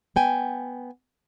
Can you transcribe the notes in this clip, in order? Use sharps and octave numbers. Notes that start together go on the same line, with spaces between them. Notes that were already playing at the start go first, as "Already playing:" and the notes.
B3 G5 G#5